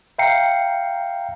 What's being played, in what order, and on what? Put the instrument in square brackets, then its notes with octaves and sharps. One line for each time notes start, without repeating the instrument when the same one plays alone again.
[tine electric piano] E5 F5 G5 A#5 C7 C#7